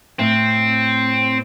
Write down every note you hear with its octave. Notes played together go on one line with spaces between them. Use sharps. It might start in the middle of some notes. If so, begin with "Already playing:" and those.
A2 C4